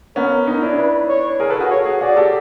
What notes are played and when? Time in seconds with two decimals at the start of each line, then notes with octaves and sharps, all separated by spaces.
0.16 B3 C#4 A#4
0.47 C#4 D#4
0.62 D4 E4
0.78 B4
1.09 C#5
1.40 G#4 A#4
1.50 A4 B4
1.60 F#4 G#4
1.70 C#5
1.85 F#4 G#4
2.01 F#4 G#4 D5
2.17 G4 A4